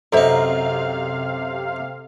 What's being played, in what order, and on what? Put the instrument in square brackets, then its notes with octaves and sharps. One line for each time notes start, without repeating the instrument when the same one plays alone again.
[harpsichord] F#2 D#4 [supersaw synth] C3 F5 [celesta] A4 [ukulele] C5 E5 A#5